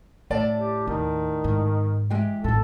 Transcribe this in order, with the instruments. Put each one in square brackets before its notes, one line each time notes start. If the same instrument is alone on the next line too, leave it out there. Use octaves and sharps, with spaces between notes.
[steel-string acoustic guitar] A2 D5 A5 [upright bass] C#4
[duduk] G4
[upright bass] D#2 [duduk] D#3
[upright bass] G#2
[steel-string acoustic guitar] E3 G#3 G4
[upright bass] G#1 A2 [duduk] A4